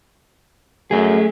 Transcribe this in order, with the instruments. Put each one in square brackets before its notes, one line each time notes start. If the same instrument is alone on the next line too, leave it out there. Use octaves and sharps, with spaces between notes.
[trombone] F#2 [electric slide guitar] A3 G#4